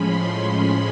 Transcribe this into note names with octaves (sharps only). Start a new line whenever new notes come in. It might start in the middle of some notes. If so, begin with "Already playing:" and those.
Already playing: A2 F3 G#3 C#4 B5 C6